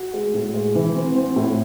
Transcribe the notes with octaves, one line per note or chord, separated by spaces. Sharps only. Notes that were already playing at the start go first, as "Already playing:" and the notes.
Already playing: F#4
G#3
A2
G#3
E3
C4
C4
A2